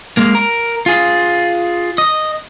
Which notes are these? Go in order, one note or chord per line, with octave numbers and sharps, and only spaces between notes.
G#3 A#3
A#4
F4 G#4
D#5